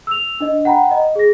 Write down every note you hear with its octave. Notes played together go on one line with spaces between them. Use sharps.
E6 F7
D4 D#5
F#5 G5 A#5 B5
D#5
G#4 A#6